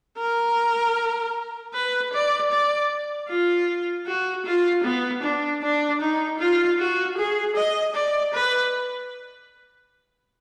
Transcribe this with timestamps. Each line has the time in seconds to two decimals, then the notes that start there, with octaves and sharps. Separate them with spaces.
0.18 A#4
1.74 B4
2.13 D5
2.51 D5
3.29 F4
4.07 F#4
4.46 F4
4.84 B3
5.23 D4
5.62 D4
6.01 D#4
6.39 F4
6.79 F#4
7.17 G#4
7.56 D#5
7.95 D5
8.34 B4